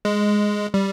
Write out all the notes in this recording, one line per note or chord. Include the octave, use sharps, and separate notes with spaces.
G#3
G3